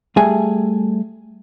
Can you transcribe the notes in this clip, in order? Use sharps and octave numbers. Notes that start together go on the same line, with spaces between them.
G3 A3 G#4 G#5